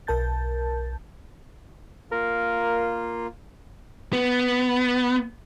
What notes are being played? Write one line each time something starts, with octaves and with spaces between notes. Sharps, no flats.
B1 A#4 A5 G6 A6
A#3 F4 A#4
B3